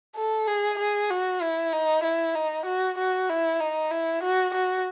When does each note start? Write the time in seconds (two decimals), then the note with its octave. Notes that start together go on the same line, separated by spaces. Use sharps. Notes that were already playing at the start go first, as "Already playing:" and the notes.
0.16 A4
0.48 G#4
0.79 G#4
1.10 F#4
1.42 E4
1.73 D#4
2.04 E4
2.35 D#4
2.66 F#4
2.99 F#4
3.30 E4
3.60 D#4
3.92 E4
4.24 F#4
4.55 F#4